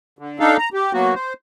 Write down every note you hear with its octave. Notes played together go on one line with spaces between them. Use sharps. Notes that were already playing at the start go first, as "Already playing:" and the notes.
D3
D4 D#4 A4 F5
A#5
G4
F#3 A#3 B3 F#4
C5